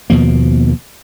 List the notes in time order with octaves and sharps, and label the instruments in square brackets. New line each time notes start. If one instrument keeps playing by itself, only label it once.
[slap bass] D#2 B2 F3 A#3